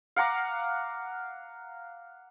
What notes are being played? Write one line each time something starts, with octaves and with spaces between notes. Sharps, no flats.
F5 F#5 A#5 D6